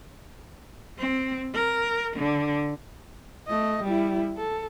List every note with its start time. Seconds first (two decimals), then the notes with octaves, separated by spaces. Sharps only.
0.98 C4
1.54 A#4
2.16 D3
3.47 A3 D#5
3.84 G3 E4
4.37 A4